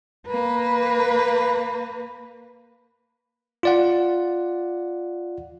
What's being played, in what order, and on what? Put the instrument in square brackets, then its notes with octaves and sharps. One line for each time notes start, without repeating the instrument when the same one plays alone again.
[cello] A#3 B4
[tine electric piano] F4 D5 F#5